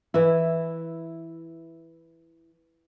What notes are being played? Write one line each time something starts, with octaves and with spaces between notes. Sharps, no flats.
E3 E4